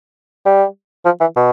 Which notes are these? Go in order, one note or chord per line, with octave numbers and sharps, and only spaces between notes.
G3
F3
E3
B2